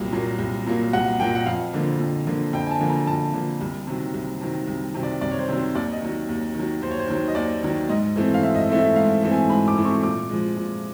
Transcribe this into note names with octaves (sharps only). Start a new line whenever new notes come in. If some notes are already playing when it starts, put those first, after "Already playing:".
Already playing: C2 A#2 F#3 A#3
A#2 F#3 A#3
C2
A#2 F#3 A#3
C2 F#5
A#2 F#3 A#3 G5
F#5
F2 F5
D3 F3 A#3
F2
D3 F3 A#3
F2 G5
G#5
A5
D3 F3 A#3
A#5
F2 A5
D3 F3 A#3
C2
C3 D#3 F#3
C2
C3 D#3 F#3
C2
C3 D#3 F#3
D5
C2 D5
C#5
C5
C3 D#3 F#3
C5
D#2 D5
D#5
D#3 F#3
D#2
D#3 F#3
D#2 C5
C#5
C5
D#3 F#3 C#5
D#5
D#2 D5
D#3 F#3
G#2 D#5
E3 A3 C4
F5
G#2 E5
D#5
E5
E3 A3 C4
E5
G#2 F5
E3 A3 C4
G#5
G#2 B5
D6
E3 A3 C4
C#6
A#2 D6
F3 G#3
A#2